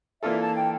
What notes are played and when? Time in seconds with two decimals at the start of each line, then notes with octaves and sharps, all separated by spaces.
0.23 E3 A#3 D4 F4 A4 E5
0.40 A5
0.55 G5